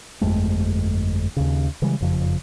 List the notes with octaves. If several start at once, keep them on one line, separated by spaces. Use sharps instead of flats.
G1 F2 G#3 A3
D#2 C#3
C#3 E3 G3 G#3
F#1 F2 C#3 F3